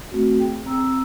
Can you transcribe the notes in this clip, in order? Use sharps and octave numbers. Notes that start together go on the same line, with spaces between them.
A3 C4 F#4
G#4 G5
C4 A#5 E6